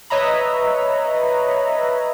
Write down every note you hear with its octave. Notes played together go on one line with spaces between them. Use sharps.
B4 C#5 D#5 E5 A#5 B5